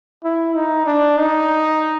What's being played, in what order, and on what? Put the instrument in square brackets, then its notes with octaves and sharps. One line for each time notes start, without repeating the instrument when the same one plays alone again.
[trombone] E4
D#4
D4
D#4